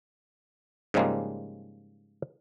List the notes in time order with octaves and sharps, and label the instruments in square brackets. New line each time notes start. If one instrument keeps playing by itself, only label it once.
[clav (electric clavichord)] G#2 C#3 F3 G3 G#3 A#3